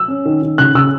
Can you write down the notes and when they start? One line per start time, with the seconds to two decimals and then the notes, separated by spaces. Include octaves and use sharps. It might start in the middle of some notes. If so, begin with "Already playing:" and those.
Already playing: E6
0.08 C#4
0.25 D#3
0.42 D#3
0.58 C#3 F#6
0.75 C#3 E6